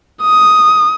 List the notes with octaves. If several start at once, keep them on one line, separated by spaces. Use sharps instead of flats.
D#6